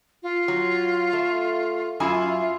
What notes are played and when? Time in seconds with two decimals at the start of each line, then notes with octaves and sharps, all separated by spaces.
0.23 F4
0.48 F#3
1.13 A3
2.00 F#2 E4 F4 G#5